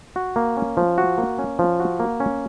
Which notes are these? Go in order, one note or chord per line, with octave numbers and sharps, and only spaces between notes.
F#4
A#3
C#4
F3
F#4
A#3
C#4
F3
F#4
A#3
C#4